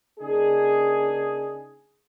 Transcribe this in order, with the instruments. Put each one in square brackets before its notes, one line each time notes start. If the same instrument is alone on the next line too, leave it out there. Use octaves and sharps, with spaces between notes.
[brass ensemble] C#3 A#3 D4 D#4 G#4